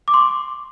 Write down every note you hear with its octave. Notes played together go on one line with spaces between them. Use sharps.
D6
C6
C#6